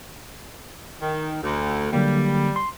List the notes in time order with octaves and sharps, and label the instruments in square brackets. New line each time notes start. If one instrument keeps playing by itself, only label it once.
[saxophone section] D#3
D2
[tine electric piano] D3 F#3 A#3 [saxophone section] G3
[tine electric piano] C6